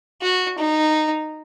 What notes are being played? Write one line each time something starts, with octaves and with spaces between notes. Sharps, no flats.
F#4
D#4